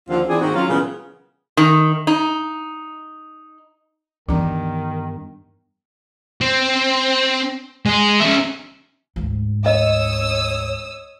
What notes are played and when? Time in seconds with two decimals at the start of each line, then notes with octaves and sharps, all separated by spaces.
0.09 D#2 D3 F3 C4 F4
0.28 E3 C4 D4 G#4
0.41 G#2 D#3 A#3 C4 F#4
0.55 F#3 C#4 F4
0.68 A#2 C#3 E3 G3 A#3 B3
1.57 D#3
2.07 D#4
4.29 G2 D#3 E3 B3 D4 A#5
6.41 C4
7.86 G#3 G#4
8.20 C#4 E5
9.16 D2 G#2
9.66 C#5 D#5 D#6 E6